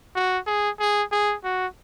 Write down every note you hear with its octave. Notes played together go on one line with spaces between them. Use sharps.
F#4
G#4
G#4
G#4
F#4